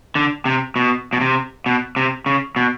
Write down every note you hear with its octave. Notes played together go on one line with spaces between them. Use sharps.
D3
C3
B2
B2
C3
B2
C3
C#3
B2